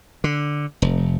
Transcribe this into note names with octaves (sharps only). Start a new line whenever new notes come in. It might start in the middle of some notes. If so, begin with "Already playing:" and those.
D3
F1